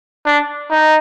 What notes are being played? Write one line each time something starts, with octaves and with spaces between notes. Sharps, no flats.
D4
D#4